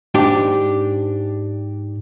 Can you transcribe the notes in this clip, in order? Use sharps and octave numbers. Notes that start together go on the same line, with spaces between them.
G#2 D4 G4